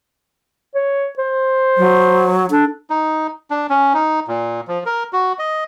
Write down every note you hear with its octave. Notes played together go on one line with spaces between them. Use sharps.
C#5
C5
F#3
D4 A4
D#4
D4
C#4
D#4
A#2
F3
A#4
F#4
D#5